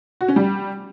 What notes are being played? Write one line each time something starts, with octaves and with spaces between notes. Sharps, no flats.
F#4
C#4
G3